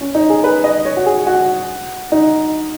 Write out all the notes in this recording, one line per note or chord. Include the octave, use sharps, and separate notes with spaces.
C#4
D#4
G#4
B4
D#5
C#5
F#4
G#4
F#4
D#4